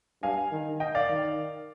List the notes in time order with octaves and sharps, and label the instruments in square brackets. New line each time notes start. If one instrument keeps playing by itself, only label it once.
[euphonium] G2 [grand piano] F5 G#5
[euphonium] D#3
[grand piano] D#5 G5
D5 F5
[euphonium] D#3